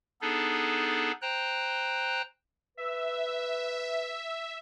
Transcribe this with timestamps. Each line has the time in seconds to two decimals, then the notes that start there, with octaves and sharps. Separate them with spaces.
0.21 B3 D4 D#4 G#4 A4
1.22 C5 G5 A#5 F#6
2.77 B4 E5